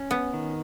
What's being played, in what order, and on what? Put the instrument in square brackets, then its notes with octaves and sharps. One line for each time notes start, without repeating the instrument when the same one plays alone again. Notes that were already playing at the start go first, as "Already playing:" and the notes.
Already playing: [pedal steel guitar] C#4
[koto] B3
[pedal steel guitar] D#3